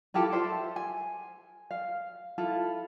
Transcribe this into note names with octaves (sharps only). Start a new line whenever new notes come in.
E4 F4 G4 A4
A4 C5 E5
G#5
F5
E4 F4 A4